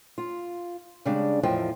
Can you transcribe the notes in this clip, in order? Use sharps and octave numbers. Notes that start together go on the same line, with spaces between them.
F4
C#3 G3 G#3 D4
E2 A2 F3 D#5 G5